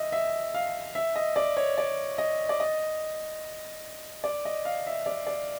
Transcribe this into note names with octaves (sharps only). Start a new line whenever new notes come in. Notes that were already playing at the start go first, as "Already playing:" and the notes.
Already playing: D#5 E5
E5
F5
E5
D#5
D5
C#5
D5
D#5
D5
D#5
D5
D#5
F5
E5
D5
D5